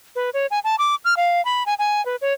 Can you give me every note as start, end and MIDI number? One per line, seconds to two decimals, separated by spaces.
0.16 0.30 71
0.34 0.46 73
0.51 0.59 80
0.64 0.76 81
0.79 0.95 86
1.05 1.14 89
1.17 1.44 77
1.45 1.63 83
1.66 1.74 80
1.79 2.04 80
2.06 2.16 71
2.22 2.33 73